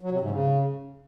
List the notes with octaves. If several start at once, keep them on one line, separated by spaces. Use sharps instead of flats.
F#3
C3
G#2
C#3